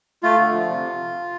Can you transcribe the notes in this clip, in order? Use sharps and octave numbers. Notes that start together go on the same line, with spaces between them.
A3 F4
D3
F3
C3